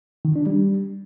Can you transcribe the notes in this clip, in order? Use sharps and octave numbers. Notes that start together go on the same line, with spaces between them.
D#3
D4
G3